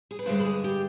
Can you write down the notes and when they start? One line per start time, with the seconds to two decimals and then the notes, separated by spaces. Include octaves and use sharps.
0.11 G#4
0.19 B4
0.26 G2 D3 G#3 D4 C5
0.40 B4
0.45 G#4
0.64 G4